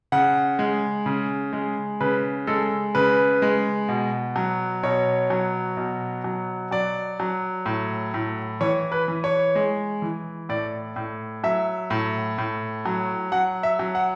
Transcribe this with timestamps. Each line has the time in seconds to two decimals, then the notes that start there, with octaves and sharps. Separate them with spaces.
0.12 C#3 F#5
0.59 G#3
1.06 C#3
1.53 G#3
2.01 C#3 B4
2.47 G#3 A4
2.95 C#3 B4
3.42 G#3
3.89 B2
4.36 F#3
4.83 B2 C#5
5.30 F#3
5.77 B2
6.24 F#3
6.71 F#3 D5
7.20 F#3
7.66 A2
8.14 A2
8.61 E3 C#5
8.92 B4
9.08 E3
9.24 C#5
9.55 G#3
10.02 E3
10.49 A2 D5
10.96 A2
11.44 F#3 E5
11.90 A2
12.38 A2
12.86 F#3
13.32 F#3 F#5
13.63 E5
13.79 F#3
13.95 F#5